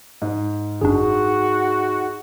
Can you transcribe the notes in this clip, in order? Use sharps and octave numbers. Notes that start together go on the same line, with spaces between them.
G#2
G1 F#2 D4 D#4 F#4 G#4